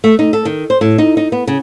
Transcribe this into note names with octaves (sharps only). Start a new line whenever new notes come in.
A3
D#4
A4
D#3
C5
A2
D#4
D#4
B3
C#3